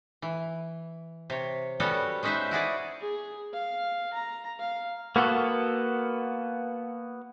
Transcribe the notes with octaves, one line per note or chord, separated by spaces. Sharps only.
E3
C3 C#5
G3 B3 C#4 F#4 A4
G#3 C#4 D#4 B4 C5 E5
E4 F#4 G#4 D5
G#4
F5
A#5
F5
A#3 B3 F#4 A4